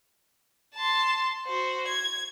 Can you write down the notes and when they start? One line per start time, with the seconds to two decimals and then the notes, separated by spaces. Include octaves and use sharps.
0.75 A5 C6
1.46 F#4 C5
1.87 G#6